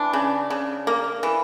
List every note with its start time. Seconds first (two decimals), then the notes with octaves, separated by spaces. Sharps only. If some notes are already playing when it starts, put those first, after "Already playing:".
Already playing: E3 D4
0.13 C#3
0.50 C#3
0.87 A#3
1.23 E3